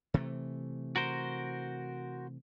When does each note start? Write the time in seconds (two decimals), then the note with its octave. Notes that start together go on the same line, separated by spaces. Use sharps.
0.14 C3 E3 A3
0.96 F#4 A#4 C5